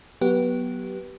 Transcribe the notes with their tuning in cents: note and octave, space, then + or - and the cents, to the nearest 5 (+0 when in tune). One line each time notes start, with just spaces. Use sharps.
F#3 +0 B3 -15 G4 -20